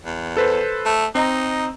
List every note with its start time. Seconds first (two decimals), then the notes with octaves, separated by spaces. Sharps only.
0.05 E2
0.37 A4 B4 C5
0.86 A3
1.15 C4 D#4 D#5 A#5